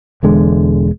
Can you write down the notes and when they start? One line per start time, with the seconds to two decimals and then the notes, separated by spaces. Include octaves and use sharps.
0.23 E1 E2 D3 G#3